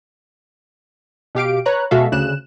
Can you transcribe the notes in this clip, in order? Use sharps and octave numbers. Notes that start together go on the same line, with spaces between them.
B2 G4 F5 D7
B4 C#5 A#5 F#6
B2 G#3 F#4 A4 E5 F5
D2 C#3 F#6 E7